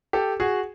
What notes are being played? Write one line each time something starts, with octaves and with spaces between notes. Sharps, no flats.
G4 A4
F#4 G#4